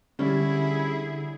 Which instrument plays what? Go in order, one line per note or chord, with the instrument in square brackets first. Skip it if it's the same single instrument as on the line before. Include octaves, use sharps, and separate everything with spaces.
[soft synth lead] D3 [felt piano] G3 [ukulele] C#4 [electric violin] E4 G#4